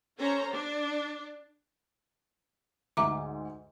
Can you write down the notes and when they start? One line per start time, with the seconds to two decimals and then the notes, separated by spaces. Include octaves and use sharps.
0.18 C#4 A4 C5 C#5 A#5
0.51 D4 D5
2.97 D2 G#2 E5 A#5 D6